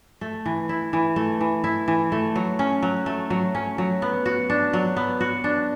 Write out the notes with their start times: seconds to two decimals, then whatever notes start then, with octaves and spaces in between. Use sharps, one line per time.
0.21 A3
0.46 E3
0.69 E4
0.93 E3
1.16 A3
1.41 E3
1.64 E4
1.88 E3
2.12 A3
2.36 F#3
2.59 C#4
2.83 F#3
3.06 A3
3.30 F#3
3.55 C#4
3.78 F#3
4.02 B3
4.26 F#4
4.50 D4
4.73 F#3
4.96 B3
5.21 F#4
5.44 D4